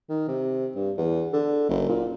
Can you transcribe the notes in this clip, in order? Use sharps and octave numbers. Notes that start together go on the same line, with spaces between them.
D#3
C3
G2
E2
D3
F#1
A#2